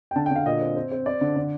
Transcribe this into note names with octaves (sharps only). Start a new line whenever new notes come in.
G5
D3 A5
G5
D3 F5
A#2 D#5
C4
C4
C4
C4 D5
D3
D3